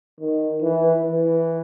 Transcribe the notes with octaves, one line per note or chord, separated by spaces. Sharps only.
D#3
E3
E3